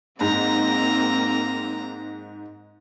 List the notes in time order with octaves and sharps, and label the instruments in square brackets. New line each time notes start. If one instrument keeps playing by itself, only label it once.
[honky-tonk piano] G#2 [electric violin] A#3 C4 [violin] A#5